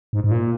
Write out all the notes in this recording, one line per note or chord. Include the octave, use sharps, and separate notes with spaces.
G#2
G#2
A#2